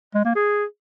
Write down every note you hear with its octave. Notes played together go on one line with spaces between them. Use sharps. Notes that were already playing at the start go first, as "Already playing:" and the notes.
G#3
A#3
G#4